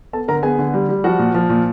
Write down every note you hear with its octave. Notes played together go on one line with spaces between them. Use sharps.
B3 A4 A5
D3 A#4 A#5
B3 G#4 G#5
D3
G3
G3
F3 F#4 F#5
A#2
F3
A#2